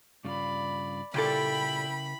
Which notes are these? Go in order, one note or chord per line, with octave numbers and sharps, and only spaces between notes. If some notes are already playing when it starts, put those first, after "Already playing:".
G2 C#3 F4 D5 B5
A#2 C#3 G3 E4 A4 A#4 G5 B5